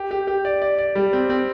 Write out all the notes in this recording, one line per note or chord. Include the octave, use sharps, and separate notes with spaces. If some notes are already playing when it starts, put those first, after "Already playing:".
Already playing: G4
G4
G4
D5
D5
D5
G3
C4
C4